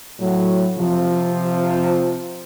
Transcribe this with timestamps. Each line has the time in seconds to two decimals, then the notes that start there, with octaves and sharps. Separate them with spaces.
0.20 A2 F#3
0.78 C3 F3